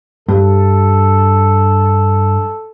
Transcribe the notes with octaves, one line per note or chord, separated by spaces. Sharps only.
G2 A4